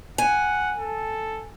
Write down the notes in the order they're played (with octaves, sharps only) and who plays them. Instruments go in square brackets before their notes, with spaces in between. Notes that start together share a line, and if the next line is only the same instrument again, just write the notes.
[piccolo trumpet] F#5 [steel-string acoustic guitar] G#5
[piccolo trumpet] A4